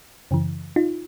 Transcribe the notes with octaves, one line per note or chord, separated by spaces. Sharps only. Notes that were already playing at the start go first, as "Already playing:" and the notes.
F#2 C#3 E3
D#4 F4